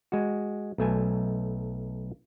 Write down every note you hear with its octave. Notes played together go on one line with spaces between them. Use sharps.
G#3 F#4
B1 A3 G#5